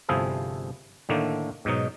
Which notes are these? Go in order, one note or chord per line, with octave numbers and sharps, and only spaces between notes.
G1 C3 F3 E4 G#4 A4
A2 D3 D#3 A3 A#3
G#2 B2 F#3 D#4